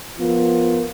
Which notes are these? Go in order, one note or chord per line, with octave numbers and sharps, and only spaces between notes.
F3 B3 F4 A#4